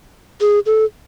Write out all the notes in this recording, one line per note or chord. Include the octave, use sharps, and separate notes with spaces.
G#4
A4